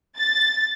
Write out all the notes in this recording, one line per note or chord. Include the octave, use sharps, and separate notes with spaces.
A6